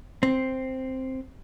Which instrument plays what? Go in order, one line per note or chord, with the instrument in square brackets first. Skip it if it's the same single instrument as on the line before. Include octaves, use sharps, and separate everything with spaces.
[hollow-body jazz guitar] C4